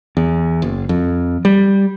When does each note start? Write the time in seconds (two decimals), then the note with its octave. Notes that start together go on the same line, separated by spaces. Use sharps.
0.17 E2
0.62 F#1
0.89 F2
1.45 G3